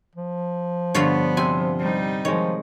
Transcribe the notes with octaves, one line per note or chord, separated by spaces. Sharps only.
F3
G2 D3 B3 F4 C#5
C3 C4 C5 G#5
G3 D#4
D#3 F3 G#3 C#5